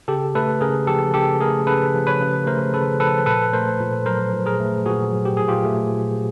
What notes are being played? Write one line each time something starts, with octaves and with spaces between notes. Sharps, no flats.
C#3 G4 A4
A3 A4 B4
C#3 G#4 A#4
F3 G4 A4
C#3 G4 A4
A3 G#4 A#4
C#3 A4 B4
F3
B4 C#5
C#3
A3 A#4 C5
C#3 A4 B4
F3 A4 B4
A#2 A4 B4
A3 A#4 C5
A#2
F#3 A#4 C5
A#2
G#4 A#4
A3
A#2 F#4 G#4
F#3
G4
A#2 G#4
F4 G4
A3
A#2